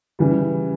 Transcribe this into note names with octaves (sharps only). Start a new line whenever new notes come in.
C#3 E3 G3